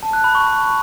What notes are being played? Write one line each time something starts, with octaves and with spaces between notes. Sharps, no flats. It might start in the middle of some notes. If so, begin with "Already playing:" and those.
A5
F#6
B5
C#6